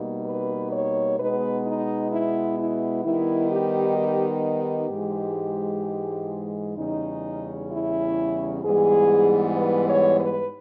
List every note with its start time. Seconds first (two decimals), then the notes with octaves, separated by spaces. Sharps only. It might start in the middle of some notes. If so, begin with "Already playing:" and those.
Already playing: B2 G3 A#3 D#4
0.25 B4
0.72 C#5
1.18 B2 G#3 B3 D#4 B4
1.65 D#4
2.12 E4
2.58 E4
3.04 D#3 G3 B3 D#4 E4
3.51 G4
3.98 G4
4.60 G4
4.91 G#2 E3 G#3
6.77 E2 C#3 G3 C#4 D#4
7.70 E4
8.63 G#2 E3 G3 B3 G#4
9.57 B4
9.88 C#5
10.19 B4